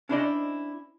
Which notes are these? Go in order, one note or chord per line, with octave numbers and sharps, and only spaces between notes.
C#4 D4 E4 C5 D5 D#5